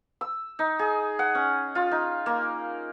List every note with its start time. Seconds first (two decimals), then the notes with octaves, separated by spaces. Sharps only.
0.21 E6
0.59 D#4
0.79 G#4
1.19 F#5
1.35 C#4
1.75 F4
1.91 D#4
2.26 A#3